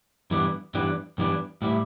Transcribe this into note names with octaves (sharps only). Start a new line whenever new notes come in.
G2 E3 G3 B3 D4
G2 E3 G3 B3 D4
G2 E3 G3 B3 D4
A2 G3 E4